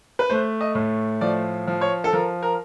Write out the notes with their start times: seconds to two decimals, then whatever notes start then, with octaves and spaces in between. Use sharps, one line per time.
0.19 B4
0.29 A3 C5
0.61 D#5
0.75 A2
1.21 F3 D5
1.67 F3
1.81 C#5
2.04 A4
2.13 F3 A#4
2.42 A#4